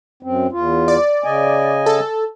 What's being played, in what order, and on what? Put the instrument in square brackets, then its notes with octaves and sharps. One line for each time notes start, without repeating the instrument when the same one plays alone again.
[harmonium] F#2 C4
E2 F4
[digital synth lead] D5
[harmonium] C#3 D#5 G#5
[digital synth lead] A4